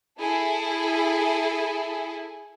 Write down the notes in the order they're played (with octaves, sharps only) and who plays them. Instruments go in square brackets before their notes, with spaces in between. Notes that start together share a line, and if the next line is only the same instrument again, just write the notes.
[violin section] E4 G#4 A4